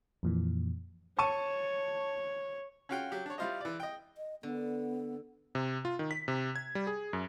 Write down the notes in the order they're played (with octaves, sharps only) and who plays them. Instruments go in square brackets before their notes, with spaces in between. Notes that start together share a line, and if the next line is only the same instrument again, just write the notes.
[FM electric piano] F2 A#2 E3
[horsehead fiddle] C#5 [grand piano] A5 C#6 D#7
[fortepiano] C#4 F4 F#4 F5 G5
F#3 G4
D4 C#5
G3 E4 F4 C5 D#5
E3 D5
D#5 G5
[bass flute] D#5
[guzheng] D3 [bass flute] B3
[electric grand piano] C3
F4
D#3
B6
C3
G#6
G3
G#4
F#2